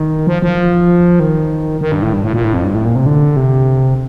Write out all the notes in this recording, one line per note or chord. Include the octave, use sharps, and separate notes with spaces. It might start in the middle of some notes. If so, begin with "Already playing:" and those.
Already playing: D#3
F3
F3
D#3
D#3
G2
A2
G2
A2
A#2
A2
F2
G2
A2
A#2
C3
D3
C3